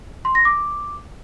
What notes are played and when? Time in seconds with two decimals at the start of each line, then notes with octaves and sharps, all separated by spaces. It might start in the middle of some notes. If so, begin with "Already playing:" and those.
0.25 C6
0.35 A#6
0.45 D6